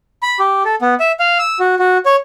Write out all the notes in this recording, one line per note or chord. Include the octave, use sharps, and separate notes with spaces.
B5
G4
A4
B3
E5
F5
E6
F#4
F#4
C#5